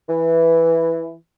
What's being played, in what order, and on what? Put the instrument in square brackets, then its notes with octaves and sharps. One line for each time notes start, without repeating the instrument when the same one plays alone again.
[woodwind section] E3